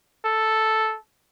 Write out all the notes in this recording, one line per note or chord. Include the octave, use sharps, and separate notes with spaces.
A4